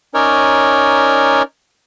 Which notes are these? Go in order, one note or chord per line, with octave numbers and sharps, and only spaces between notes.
C#4 D#4 A#4 C#5 D5